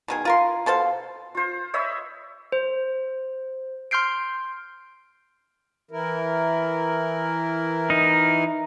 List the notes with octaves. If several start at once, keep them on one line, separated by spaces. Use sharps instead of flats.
B2 D#3 G#4
F4 A#4 C6
B2 A4 C5 F5
F4 C5
C#5 D#5 E5 B5
C5
C6 F6 G6 C7 D7
E3 E4 A#4
D#4